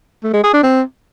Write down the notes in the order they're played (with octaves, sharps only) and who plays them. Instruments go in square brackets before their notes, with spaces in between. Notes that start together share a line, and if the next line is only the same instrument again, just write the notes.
[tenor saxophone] A3
G#3
G#4
D4
C4